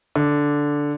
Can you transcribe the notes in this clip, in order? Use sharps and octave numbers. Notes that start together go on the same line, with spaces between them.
D3